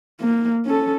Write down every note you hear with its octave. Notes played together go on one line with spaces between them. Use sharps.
A#3
C#4 A4